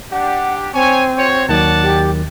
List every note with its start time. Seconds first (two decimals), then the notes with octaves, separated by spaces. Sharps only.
0.12 D4 G4 F#5
0.74 C4 C#5 G#5
1.18 F#4 C5 C#5
1.49 D#2 D#3 F#3 D5 F#5 A5
1.83 G4